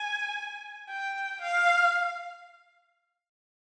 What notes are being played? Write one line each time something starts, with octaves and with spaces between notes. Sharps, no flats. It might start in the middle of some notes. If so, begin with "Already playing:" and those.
Already playing: G#5
G5
F5